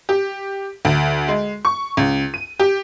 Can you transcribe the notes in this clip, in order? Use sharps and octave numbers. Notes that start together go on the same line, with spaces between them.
G4
D2
G#3
C#6
C#2
D#7
G4